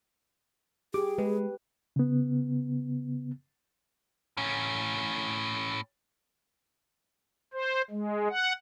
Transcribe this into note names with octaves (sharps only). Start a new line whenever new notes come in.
G4 G#4 D6
G#3 B4
C#3 B3
A2 C#4
C5
G#3
F#5